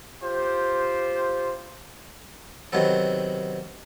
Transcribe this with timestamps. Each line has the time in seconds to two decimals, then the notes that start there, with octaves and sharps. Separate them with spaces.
0.22 F4 G4 C5
2.72 C3 D#3 F#3 B3 A4